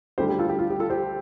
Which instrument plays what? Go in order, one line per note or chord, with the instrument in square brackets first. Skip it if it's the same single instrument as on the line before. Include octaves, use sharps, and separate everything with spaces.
[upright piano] D2 D3 G3 [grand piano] G4 C5
[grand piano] G4
F4 A4
G4
F4
G4
F4 A4
G4 C5